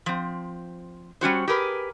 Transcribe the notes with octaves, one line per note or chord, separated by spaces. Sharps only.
F3 C4
G3 C#4 F#4 C5
G4 G#4 A#4 B4